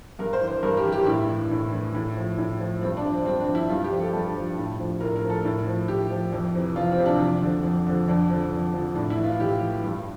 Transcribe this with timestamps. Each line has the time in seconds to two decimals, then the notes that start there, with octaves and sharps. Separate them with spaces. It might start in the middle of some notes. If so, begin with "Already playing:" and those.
0.19 G2 A#4
0.33 C5
0.41 E3
0.48 C5
0.63 G2 A#4
0.77 G4
0.84 E3
0.92 G4
1.06 A2 E4
1.29 E3
1.51 A2
1.72 E3
1.95 A2 E4
2.17 F3
2.38 A2
2.60 F3
2.81 G2 C4
2.97 D4
3.05 F3
3.12 C4
3.25 G2 C4
3.40 D4
3.47 F3
3.55 E4
3.69 G2 F4
3.84 G4
3.92 F3
3.99 A4
4.13 G2 A4
4.35 F3
4.58 A2
4.80 F3
5.01 A2 A#4
5.16 A#4
5.24 F3
5.30 A4
5.45 A2
5.67 F3
5.88 A2 G4
6.10 F3
6.33 F2
6.54 C3 E3
6.76 F2 F4
6.92 C4
6.99 C3 E3
7.06 D4
7.20 F2 D4
7.42 D3 F3
7.63 F2
7.87 D3 F3
8.08 F2 D4
8.29 D3 F3
8.52 F2
8.73 D3 F3
8.95 A2 D4
9.10 E4
9.18 E3
9.24 F4
9.39 A2 G4
9.61 E3
9.84 G2